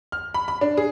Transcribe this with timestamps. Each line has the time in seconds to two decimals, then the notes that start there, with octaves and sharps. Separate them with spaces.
0.12 F6
0.34 B5
0.48 B5
0.61 D4
0.77 G#4